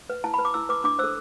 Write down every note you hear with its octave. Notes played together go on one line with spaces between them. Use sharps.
B4
E4 A5
B4 B5
D6
E4 E6
B4 D6
D4 D6
A4 C5 E6